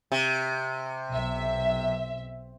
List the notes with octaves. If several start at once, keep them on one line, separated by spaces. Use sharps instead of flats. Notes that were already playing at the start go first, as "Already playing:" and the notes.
C3
B1 E5